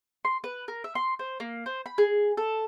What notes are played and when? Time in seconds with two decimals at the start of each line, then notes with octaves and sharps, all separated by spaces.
0.25 C6
0.44 B4
0.68 A#4
0.84 E5
0.95 C6
1.19 C5
1.40 A#3
1.66 C5
1.86 B5
1.98 G#4
2.37 A4